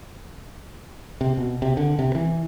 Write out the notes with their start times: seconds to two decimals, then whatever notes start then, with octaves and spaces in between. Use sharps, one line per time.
1.21 C3
1.37 B2
1.62 C3
1.77 D3
1.99 C3
2.15 E3